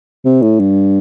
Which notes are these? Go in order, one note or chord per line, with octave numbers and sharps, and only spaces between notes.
C3
A2
G2